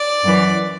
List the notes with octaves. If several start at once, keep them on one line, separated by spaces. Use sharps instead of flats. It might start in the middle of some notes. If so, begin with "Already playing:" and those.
Already playing: D5
F#2 E3